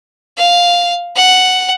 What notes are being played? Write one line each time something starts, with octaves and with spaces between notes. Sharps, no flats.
F5
F#5